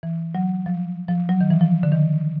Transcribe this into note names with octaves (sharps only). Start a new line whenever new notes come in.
E3
F#3
F3
F3
F#3
D#3
E3
F3
D3
D#3